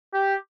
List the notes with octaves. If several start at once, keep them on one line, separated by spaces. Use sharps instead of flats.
G4